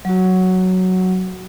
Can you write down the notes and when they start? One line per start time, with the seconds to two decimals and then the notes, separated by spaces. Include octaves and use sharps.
0.05 F#3 F#4